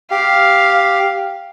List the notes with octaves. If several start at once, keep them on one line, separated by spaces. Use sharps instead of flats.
G4 F5